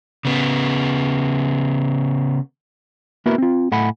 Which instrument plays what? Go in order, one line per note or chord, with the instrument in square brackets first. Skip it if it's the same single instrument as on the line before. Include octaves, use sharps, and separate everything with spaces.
[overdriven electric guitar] C#3 B3
[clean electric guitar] A#3 B3 E4 F#4 A#4 B4
C4 F4
A2 A4 F#5 G#5 B5